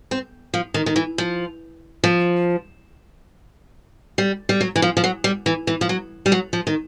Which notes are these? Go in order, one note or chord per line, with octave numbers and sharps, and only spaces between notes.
C4
F3
D#3
D#3
E3
F3
F3
G3
G3
F#3
E3
F3
F3
F#3
G3
E3
E3
F3
F#3
G3
F#3
F3
D#3